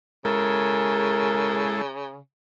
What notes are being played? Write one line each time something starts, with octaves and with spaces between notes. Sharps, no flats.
C#3 G#3 E4 A4 A#4